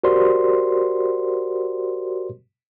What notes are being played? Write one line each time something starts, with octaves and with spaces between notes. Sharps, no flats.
F#4 G4 A#4 C5 D5 C6